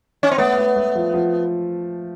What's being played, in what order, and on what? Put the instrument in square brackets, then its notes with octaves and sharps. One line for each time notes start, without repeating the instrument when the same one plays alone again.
[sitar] C#4
C4
[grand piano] A3 [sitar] B3
[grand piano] A3
A3
F3
F3